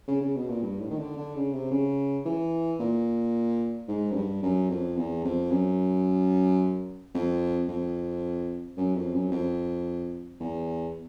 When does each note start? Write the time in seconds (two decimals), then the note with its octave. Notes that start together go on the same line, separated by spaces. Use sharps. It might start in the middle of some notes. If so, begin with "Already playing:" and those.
0.08 C#3
0.21 C#3
0.36 B2
0.49 A#2
0.62 G2
0.80 A2
0.90 D#3
0.99 D3
1.17 D3
1.35 C#3
1.53 C3
1.71 C#3
2.25 E3
2.79 A#2
3.88 G#2
4.11 F#2
4.16 G2
4.43 F#2
4.70 F2
4.96 E2
5.24 F2
5.51 F#2
7.14 F2
7.68 F2
8.77 F#2
8.96 F2
9.14 F#2
9.31 F2
10.40 E2